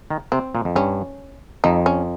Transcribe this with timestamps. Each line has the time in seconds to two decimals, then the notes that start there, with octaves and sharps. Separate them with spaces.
0.10 D#3
0.32 C3 C4
0.55 A#2
0.65 F2
0.76 G2 C#4
1.64 F2 D#4
1.86 C#4